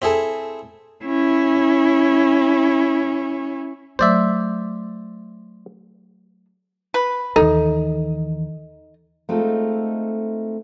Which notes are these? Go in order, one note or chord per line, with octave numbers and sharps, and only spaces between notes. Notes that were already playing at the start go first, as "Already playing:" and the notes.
C4 E4 G#4 A4
C#4 E4
F#3 A3 C5 D5 E5
B4
D#2 E3 D#4 A4
G#3 A3 C4 D#4 F4 A4